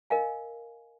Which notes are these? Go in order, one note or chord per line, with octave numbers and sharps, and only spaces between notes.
A#4 D#5 F5 G#5